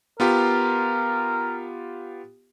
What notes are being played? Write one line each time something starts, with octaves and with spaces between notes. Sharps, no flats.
B3 F4 G4 A#4